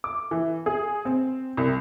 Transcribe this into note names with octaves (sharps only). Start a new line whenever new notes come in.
D6
E3
G#4
C4
C2